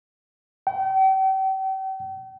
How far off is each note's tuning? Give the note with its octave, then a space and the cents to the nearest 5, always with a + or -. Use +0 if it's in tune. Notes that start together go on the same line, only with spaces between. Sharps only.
G5 -40